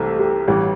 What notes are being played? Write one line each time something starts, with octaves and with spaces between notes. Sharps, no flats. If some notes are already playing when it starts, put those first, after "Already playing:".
Already playing: C2 C3 E3 A3 A4
G4
A1 G2 E3 G4